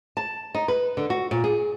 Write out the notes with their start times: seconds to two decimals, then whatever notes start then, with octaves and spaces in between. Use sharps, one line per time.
0.17 A5
0.55 D#4
0.68 B4
0.97 D3
1.10 F#4
1.31 A#2
1.44 G#4